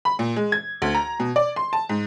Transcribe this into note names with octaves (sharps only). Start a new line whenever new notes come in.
B5
A#2
G#3
G#6
D2
A#5
B2
D5
C6
A5
G#2